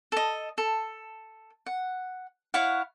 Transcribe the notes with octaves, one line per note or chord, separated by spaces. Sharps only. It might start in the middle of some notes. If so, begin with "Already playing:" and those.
A4 D#5
A4
F#5
E4 C#5 F5 F#5